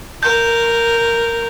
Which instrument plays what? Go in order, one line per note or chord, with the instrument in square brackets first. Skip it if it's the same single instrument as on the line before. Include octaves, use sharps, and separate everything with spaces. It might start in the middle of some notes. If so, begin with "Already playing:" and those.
[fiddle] A#4 [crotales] G6